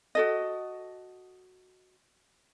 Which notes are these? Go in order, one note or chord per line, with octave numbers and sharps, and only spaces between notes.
F#4 A4 D#5